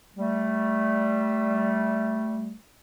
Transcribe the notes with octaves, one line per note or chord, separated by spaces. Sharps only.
G3 A3